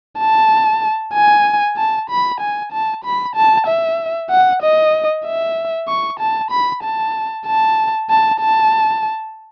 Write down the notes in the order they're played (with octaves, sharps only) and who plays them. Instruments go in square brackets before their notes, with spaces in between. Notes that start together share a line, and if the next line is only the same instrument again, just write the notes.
[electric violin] A5
G#5
A5
B5
G#5
A5
B5
A5
E5
F#5
D#5
E5
C#6
A5
B5
A5
A5
A5
A5